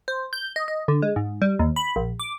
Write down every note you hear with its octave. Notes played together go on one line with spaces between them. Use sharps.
C5
G6
D#5
D#5
D3
G#3
G#2
G3
D#2
B5
A#1
D6